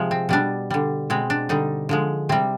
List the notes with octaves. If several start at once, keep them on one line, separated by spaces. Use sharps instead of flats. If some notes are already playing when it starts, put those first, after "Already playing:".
Already playing: C3 F3 G#3
C4
B2 G3 D4
D3 G3
B2 G#3 C4
D4
D3 G3 D#4
D3 F3 G#3
C3 G3 C4